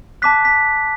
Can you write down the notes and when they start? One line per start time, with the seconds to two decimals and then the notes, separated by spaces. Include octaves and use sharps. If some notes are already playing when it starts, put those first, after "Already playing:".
0.22 A5 D6 F#6 B6
0.45 B6